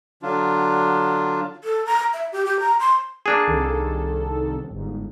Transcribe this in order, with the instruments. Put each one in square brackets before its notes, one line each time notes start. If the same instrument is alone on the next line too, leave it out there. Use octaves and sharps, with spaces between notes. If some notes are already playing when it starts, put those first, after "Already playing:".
[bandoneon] D3 F#3 D4 F4
[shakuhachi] A4
A#5
E5
G4
G4
A#5
C6
[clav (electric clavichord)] A#3 D4 G#4 [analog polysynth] F#6
[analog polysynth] C2 D#3 A4
G1 G#2